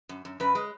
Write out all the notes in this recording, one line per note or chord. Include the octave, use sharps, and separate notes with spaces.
F#2
F#2
F#2 B4
G#3